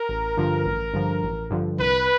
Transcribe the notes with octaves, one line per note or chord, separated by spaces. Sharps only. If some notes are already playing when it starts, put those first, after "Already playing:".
Already playing: A#4
A1
G2 D3 F3
A1
G2 D3 F3
A1
G2 D3 F3
C2 B4